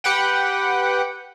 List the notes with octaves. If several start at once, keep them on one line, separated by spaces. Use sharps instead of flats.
G4 B4 F#5 G5